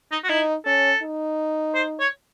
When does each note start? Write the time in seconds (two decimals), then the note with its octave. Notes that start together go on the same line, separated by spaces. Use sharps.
0.12 D#4
0.24 F#4
0.29 D#4 E4
0.65 C#4 A4
1.02 D#4
1.75 C5
2.00 C#5